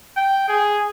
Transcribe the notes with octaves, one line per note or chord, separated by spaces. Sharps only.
G5
G#4